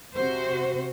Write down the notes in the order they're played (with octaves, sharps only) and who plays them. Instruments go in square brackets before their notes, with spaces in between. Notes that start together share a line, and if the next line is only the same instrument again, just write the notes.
[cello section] C3 F#4 C5